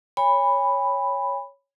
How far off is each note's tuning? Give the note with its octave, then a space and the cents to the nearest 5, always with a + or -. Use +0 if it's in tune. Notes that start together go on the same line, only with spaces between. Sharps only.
C#5 +0 G#5 -40 B5 +0